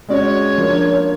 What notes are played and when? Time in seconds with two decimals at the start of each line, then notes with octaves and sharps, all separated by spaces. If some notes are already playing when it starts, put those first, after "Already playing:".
0.09 G#3 C#4 F#4 C#5 D5
0.58 F3 A#3 D4